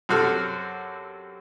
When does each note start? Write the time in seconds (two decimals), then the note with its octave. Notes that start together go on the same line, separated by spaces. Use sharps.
0.09 F#2 C3 C4 F#4 A4 F6